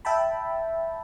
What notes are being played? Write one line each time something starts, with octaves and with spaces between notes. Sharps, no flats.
E5 G5 A5 B5